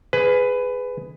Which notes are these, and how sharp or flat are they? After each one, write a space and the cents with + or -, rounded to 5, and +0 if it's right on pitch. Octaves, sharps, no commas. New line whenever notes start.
G#4 +0 B4 +15